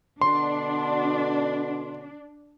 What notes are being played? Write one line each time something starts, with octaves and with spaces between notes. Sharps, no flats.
B2 D3 D4 C6